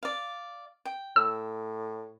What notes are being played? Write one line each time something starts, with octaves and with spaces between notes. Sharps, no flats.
D5 F5
G5
A2 E6